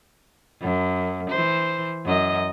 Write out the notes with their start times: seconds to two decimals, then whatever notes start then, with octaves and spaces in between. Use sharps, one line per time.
0.62 F#2
1.30 E3 C5
2.05 F#2 D#5